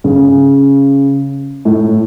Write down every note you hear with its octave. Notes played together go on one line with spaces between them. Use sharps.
C#3
A2